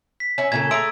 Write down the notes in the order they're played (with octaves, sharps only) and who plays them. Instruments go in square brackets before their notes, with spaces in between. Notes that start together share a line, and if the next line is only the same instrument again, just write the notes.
[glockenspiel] B6
[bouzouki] C#4 E4
[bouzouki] A#2 C#3 A4 [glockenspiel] G#6
[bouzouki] A3 G#4 A#5 [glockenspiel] C6 E6 D7